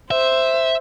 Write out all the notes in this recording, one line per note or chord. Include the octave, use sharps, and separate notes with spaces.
C5 E5